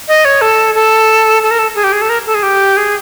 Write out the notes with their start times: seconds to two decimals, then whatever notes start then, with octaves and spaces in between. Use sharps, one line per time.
0.08 D#5
0.25 C#5
0.41 A4
0.75 A4
1.43 A4
1.51 A#4
1.59 A4
1.75 G#4
1.84 G4
1.92 G#4
2.02 A4
2.09 A#4
2.27 A4
2.35 G#4
2.43 G4
2.77 G#4